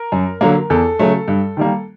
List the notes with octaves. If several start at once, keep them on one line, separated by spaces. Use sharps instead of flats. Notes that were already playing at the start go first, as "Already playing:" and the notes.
Already playing: A#4
F#2
D3 F#3 A#3
E2 A4
C#3 F#3 A3
G2
D#3 G3 A#3